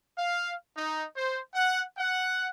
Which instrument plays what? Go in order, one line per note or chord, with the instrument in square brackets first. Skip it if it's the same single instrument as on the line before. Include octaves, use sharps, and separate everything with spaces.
[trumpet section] F5
D#4
C5
F#5
F#5